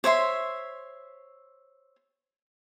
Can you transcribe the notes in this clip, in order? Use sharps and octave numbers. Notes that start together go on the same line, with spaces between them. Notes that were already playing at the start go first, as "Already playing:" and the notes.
C5 C#5 E5 C6